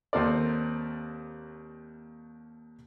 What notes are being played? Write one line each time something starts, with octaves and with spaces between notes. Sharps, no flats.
D#2 C4 A4 A#4 D5